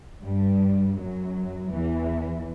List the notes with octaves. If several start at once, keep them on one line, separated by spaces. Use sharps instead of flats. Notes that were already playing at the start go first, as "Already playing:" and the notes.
G2 G3
F#2 F#3
E2 E3